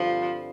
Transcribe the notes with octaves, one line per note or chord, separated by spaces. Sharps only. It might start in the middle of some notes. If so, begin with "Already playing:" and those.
Already playing: G2 D3 F3 G3 C4